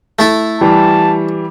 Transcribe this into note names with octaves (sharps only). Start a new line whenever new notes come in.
A3 E4 A4
E3 G3 A5